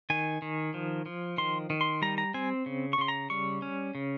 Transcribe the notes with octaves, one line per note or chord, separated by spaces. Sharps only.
D#3 G#5
D#3
F3
F3
D#3 C6
D#3
C6
G3 A#5
A#5
C4 G#5
C#3
C#6
C#3 C6
A#5
G3 C#6
C#4
C#3